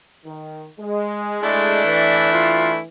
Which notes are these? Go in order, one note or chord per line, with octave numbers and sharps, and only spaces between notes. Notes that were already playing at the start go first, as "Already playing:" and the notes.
D#3
G#3
A3 D4 E4 D5
E3
F4